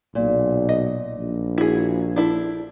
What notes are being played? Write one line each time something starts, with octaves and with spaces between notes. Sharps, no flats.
B1 A#2
D#5
A#1
E4 F#4 G#4
F3 D4 E4 A4